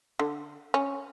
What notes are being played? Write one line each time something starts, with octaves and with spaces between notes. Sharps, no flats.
D3
C#4